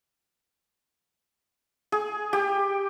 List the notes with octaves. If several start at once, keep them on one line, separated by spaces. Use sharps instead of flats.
G#4
G4